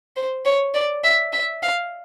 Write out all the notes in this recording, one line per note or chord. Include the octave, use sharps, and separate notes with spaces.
C5
C#5
D5
E5
E5
F5